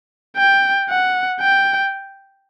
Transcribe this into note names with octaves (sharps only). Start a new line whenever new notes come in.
G5
F#5
G5